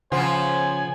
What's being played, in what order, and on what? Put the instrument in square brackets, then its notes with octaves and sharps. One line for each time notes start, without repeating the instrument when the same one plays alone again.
[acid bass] C#3 [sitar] F3 B3 F4 [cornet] C5 [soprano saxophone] G#5